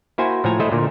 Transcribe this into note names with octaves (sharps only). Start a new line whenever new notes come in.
A#3 E4 F#4 C5 G#5
A2 F3 A4 G#5 A#5
A3 E4 A4 C5 D#5
A#2 D3 A#4